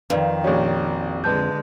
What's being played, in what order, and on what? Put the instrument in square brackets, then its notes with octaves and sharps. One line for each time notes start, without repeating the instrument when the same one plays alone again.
[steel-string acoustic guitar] F2 [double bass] D#3 [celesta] B4 D5 F5
[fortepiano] A#1 C#4 [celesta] F#4 D5
[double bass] D3 G#3 [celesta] B4 A5 G6